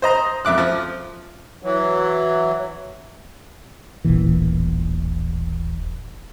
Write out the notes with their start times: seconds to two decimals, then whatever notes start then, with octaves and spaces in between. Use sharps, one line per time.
0.02 C5 D#5 A#5
0.45 F2 E5 D6 F#6
0.58 F3
1.63 E3 F#3
4.04 D#1 A1 A#2 E3